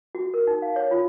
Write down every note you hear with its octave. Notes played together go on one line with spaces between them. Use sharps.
F#4
A#4
D#4
F5
C#5
F4